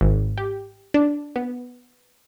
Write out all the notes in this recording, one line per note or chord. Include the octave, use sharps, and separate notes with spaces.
G#1
G4
D4
B3